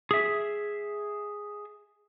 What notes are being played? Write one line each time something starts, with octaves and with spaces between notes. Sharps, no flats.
G#4 E5